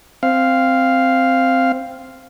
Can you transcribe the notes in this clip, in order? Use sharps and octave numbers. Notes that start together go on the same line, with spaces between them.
C4 F5